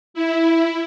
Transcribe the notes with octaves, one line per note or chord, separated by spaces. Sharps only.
E4